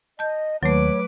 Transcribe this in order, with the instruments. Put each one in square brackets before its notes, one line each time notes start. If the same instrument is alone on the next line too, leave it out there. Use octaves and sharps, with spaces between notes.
[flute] D#5 [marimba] A5 G6
[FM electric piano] D#2 [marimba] F#3 A3 [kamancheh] B4 D6 [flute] C#5